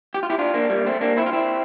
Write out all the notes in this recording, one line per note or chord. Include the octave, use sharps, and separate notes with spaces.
G4
F4
E4 G4
D4 F4
A#3 D4
G3 A#3
A3 C4
A#3 D4
C4 E4
F4
C4 E4